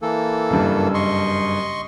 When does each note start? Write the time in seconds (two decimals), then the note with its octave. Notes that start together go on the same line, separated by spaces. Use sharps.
0.02 E3 A#3 A4
0.50 F#1 G2
0.94 D#5 C6 C#6